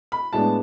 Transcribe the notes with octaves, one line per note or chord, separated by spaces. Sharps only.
B5
A2 G#3 B3 D4 A5